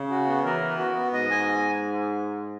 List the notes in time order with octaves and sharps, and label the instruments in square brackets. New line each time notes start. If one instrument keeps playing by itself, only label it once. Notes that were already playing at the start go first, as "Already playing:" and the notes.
Already playing: [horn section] C#3
[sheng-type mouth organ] F#4
B3
[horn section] E3 [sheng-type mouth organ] A#4
[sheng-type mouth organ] B3
F#4
B3
[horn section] G#2 [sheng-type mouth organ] D#5
[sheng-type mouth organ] G#5